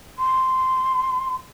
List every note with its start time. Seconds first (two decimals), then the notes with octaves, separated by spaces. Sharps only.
0.19 C6